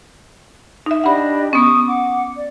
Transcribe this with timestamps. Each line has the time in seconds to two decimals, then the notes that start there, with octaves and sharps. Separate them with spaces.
0.86 D#4 E5
1.04 D4 G4 D#5 F#5 B5
1.53 B3 C#4 C#6 D#6
1.86 F#5 D6
2.34 D5